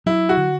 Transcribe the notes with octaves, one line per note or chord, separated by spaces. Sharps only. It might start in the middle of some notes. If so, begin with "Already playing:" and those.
F#3 E4
F#4
D3